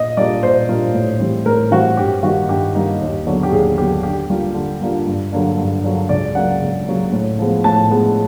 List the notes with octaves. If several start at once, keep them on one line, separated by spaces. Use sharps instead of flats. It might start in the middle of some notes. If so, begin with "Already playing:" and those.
Already playing: A#2 D#5
G3 A#3 D4 F4 D5
A#2 C5
G3 A#3 D4 F4
A2
E3 G3 C4
A2 A#4
E3 G3 C4 F#4
G2 G4
D#3 G3 A#3 D#4 F#4
G2 G4
D#3 G3 A#3 D#4
D#2
D3 F#3 B3 D4
G4
D#2 G#4
D3 F#3 B3 D4 G4
D3 G4
G3 A#3 D4 F4
D3
G3 A#3 D4 F4
G2
D3 F#3 A#3 D4
G2
D3 F#3 A#3 D4
C#2 D5
C#3 F#3 A#3 F#5
C#2
C#3 F#3 A#3
A2
F3 G#3 B3
A2 A5
F3 G#3 B3